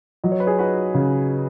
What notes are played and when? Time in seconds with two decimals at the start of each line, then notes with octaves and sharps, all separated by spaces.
0.24 F#3 D#5
0.32 C#5
0.40 B4
0.47 G#4 C#5
0.59 D#4 F#4 B4
0.95 C#3